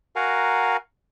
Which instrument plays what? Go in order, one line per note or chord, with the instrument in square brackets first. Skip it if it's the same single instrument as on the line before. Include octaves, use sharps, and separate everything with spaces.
[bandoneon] F#4 A#4 F5 F#5 G#5 A#5